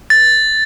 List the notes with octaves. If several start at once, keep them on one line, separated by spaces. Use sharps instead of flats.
A6